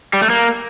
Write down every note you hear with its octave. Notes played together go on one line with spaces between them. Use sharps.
G3
A3
A#3